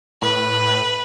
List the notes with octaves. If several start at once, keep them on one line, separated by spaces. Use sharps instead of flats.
A2 B4